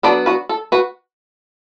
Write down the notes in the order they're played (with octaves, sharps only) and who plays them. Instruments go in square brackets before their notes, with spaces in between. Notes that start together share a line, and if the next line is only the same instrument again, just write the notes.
[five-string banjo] F#3 B3 D4 A4 D5
F#4 B4
A4
F#4 B4